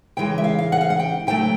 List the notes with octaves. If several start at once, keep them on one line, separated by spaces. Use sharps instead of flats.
C#3 E3 G#3 G5
E5
F5
F5
F#5
F5
F#5
G5
C#3 F#3 A3 G5